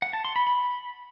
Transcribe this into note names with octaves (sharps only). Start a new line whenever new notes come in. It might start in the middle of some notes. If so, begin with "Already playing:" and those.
F#5
A5
C6
B5
B5